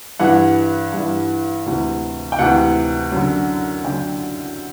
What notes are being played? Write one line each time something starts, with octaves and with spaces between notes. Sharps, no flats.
G2 E3 F#5
G2 E3
D2 C3 E3
G5
D2 C3 E3 F#5
F#2 D3
F#2 D3 G5